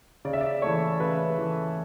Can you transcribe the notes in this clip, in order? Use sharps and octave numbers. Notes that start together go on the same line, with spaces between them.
C#3 D5
E5
D5
E3 A3 C#5
C#3 B4
E3 A3